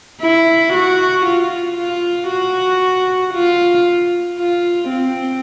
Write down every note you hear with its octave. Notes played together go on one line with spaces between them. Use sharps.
E4
F#4
F4
F4
F#4
F4
F4
C4